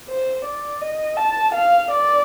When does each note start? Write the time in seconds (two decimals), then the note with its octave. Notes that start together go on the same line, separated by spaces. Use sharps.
0.08 C5
0.45 D5
0.81 D#5
1.18 A5
1.54 F5
1.90 D5